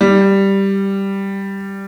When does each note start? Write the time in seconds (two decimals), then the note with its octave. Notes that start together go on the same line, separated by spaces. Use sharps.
0.01 G3